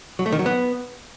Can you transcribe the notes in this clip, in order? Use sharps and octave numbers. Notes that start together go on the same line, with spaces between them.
F#3
A3
D#3
F#3
B3